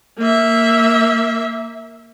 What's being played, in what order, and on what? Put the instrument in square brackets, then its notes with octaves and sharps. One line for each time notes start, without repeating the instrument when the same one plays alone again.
[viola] A#3 E5